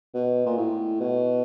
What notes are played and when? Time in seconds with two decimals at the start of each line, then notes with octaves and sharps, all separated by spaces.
0.14 B2
0.46 A#2
0.58 A2
1.00 B2